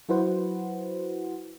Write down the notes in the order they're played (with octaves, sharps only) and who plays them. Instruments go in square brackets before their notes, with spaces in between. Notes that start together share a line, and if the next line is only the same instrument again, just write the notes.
[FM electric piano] F#3 E4 F#4 B4 C5 F#5